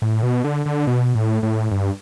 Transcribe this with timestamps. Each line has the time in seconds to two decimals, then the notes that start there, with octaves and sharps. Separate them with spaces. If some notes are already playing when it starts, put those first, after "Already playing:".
0.02 A2
0.23 B2
0.44 D3
0.66 D3
0.87 B2
1.15 A2
1.43 A2
1.71 G2